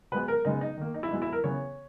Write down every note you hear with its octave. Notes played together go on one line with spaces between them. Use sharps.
B2 G#3 B3 B4
A#4
C#3 G#3 B3 D#4
D#4
D#3 A#3
D#4
E4
B2 G#3 B3 D#4
E4
A#4
C#3 E3 B3 C#5